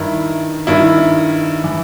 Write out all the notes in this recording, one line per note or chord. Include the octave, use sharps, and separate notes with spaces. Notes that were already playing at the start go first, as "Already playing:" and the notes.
Already playing: G2 D#3 E4
G2 D#3 E4
E3